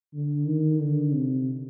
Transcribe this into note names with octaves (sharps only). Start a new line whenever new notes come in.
D3
D#3
D3
C3